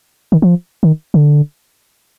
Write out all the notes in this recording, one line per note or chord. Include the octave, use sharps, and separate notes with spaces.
D#3
F3
D#3
D3